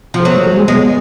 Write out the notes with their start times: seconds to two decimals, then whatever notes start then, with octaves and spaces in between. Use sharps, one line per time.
0.14 F3
0.20 A4
0.25 F#3 B3 B4
0.36 A3 A4
0.46 F#3 F#4
0.57 G#3 G#4
0.68 G#3 B3 B4